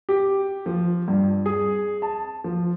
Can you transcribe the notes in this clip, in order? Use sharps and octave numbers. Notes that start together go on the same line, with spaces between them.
G4
F3
G2
G#4
A5
F3